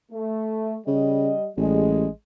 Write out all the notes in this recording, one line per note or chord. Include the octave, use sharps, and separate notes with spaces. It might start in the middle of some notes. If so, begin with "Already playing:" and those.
A3
C#3 G3 D#5
A1 G3 G#3